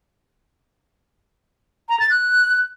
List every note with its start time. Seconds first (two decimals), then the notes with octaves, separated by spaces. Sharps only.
1.89 A#5
2.00 A6
2.10 F#6